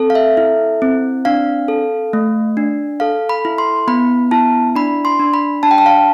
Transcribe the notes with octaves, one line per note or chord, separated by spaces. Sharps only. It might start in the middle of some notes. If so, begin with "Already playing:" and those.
Already playing: C4 A4
F5
E5
E4
C4
D4 F5
A4
A3
D4
A4 F5
B5
E4
C6
B3 B5
E4 A5
D4 B5
C6
D4
B5
D4 A5
G5
A5
F5